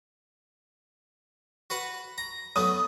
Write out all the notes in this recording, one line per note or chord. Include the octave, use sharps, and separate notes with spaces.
F#4 B4 F#5
A#5
F#3 A3 B3 D#6